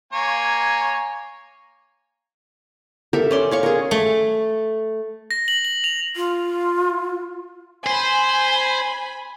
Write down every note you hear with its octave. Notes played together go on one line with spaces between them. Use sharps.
A#3 C#5 G#5
G4 A4 A#4 E5
C#4 D5 C6
C#5 F5 C#6
G#4 A#4
A3
A#6
F#7
F#7
F7
F4
C5 G#5 B5